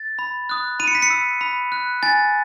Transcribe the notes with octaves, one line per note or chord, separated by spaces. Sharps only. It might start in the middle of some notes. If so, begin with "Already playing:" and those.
Already playing: A6
B5
D#6 F#6
B5 D#7
C#7
B6
C#7
E6
B5
F#6
G#5 A6